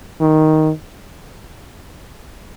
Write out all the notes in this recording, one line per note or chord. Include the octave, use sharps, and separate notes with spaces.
D#3